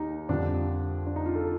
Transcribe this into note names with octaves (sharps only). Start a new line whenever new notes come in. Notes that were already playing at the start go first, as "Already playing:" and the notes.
Already playing: D#2 D#4 G4
F2 D3 G3 D4
D4
D#4
F4
A4